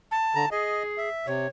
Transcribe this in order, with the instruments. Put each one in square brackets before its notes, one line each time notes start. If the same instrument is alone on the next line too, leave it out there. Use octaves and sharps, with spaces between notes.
[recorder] A5
[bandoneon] D3 A#5
[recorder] G#4 [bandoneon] D#5
[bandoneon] E5
[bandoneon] C3 [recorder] C#5